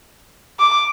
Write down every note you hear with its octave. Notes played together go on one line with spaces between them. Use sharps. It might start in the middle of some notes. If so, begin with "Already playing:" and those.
D6